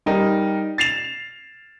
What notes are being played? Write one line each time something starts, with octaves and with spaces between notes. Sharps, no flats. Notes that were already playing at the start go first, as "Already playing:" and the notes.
G3 D#4 A#4
A6 C7 E7 F7